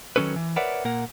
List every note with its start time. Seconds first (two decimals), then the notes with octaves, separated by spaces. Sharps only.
0.16 D#3 F#3 C#4 A4 B4
0.36 E3
0.56 A#4 B4 C#5 D5 E5 F#5
0.85 A#2 A#3 A#4 F#5